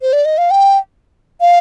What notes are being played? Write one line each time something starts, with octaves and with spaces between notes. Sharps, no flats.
C5
D5
D#5
F5
G5
F5